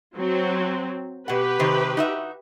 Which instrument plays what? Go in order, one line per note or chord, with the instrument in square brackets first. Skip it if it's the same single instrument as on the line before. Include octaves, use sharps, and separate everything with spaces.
[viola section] F#3 C4
[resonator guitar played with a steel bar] B2 F#5 [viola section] G4 B4
[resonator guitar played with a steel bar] C3 D#3 C5
D#4 F#4 E5